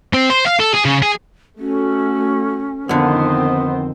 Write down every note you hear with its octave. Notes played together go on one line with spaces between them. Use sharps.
C4
C5
F5
A4
G#4
C#3
G#4
A3 C#4 F#4
F2 D3 D#3 B3 C4 C5